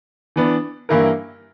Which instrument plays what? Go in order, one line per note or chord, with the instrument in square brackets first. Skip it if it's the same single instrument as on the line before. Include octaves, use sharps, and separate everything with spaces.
[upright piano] E3 B3 D4
G2 E3 A#3 E4 A#4